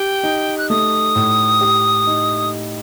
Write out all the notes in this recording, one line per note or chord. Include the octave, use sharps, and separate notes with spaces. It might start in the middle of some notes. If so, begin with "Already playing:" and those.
Already playing: G4 G5
D#4
F#6
A3 D#6
A2
G4
D#4